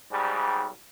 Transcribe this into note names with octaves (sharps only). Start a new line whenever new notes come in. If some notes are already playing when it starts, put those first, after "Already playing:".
B1 G#2 G3